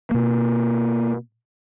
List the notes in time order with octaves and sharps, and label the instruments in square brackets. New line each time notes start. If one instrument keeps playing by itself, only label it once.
[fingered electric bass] B2 A#3